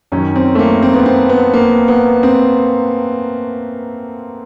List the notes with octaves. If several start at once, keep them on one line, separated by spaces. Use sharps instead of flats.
F#2 D#3 C#4
C4
A3
A#3
C4
B3
C4
B3
A#3
B3
C4